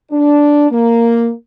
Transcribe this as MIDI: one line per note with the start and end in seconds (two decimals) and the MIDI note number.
0.11 0.69 62
0.71 1.31 58